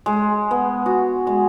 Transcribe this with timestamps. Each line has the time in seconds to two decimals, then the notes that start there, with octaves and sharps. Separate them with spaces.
0.06 G#3
0.51 B3
0.86 F#4
1.27 G#3